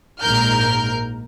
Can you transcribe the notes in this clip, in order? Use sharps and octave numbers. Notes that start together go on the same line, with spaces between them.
A#1 G#2 A#4 F6 G6